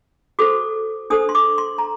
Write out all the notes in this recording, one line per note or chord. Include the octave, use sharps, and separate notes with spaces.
F#4 A4 C5 D6
D4 A4 C5 D#6
C6
D6
C6
A#5